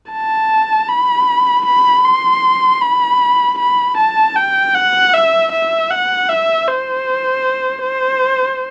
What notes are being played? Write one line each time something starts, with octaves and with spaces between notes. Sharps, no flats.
A5
B5
B5
C6
B5
B5
A5
G5
F#5
E5
E5
F#5
E5
C5
C5